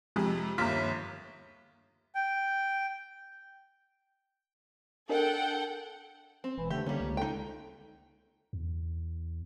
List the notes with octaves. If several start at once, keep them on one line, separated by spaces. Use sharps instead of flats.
F2 C3 G#3
G1 D#2 A#3 F4 B6
G5
D4 A4 A#4 D#5 F#5 G5
C4
E1 E3
D3 A3 G4
D3 G3 A#3 C#4
C#2
D#4 A4 G5
E2